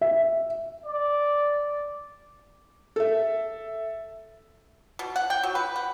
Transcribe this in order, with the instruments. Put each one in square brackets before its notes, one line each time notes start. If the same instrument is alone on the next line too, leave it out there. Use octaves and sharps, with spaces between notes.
[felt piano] E5
[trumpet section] D5
[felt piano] A4 E5
[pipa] B2
F#5
G5
F#3
B4
F#5